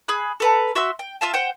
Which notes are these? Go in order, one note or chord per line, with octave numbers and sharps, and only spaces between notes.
G#4 B5 F#6
A4 B4 A#5
F#4 E5 C6 E6
G5
F4 E5 F5 A5
C5 F#5 G5